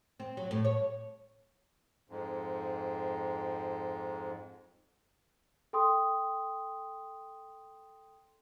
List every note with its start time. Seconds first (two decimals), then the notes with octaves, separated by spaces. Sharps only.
0.20 C4
0.37 F#3
0.51 A2
0.65 C#5
2.10 F2 G#2
5.73 A4 G5 C6 D#6